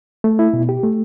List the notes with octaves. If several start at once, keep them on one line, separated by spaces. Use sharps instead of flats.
A3
E4
B2
G4
A3